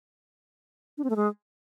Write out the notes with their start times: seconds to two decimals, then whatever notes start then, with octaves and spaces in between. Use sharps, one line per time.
0.98 D4
1.04 C4
1.10 A3
1.16 G#3